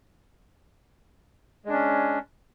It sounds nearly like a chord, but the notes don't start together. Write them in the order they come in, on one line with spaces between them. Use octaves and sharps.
G#3 D4 C#4